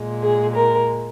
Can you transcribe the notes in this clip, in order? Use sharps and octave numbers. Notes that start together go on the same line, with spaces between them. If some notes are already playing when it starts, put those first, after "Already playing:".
Already playing: A#2 G#3
G#4
A#4